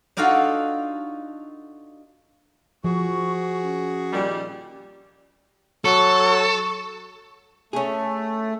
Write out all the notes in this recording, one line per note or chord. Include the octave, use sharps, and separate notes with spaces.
D4 D#4 F4 F#4 A4 F5
F3 F#4 G#4 C#6
C#4
A#2 D#3 G3
F#3 A4 C#6
A3 C#4 G#4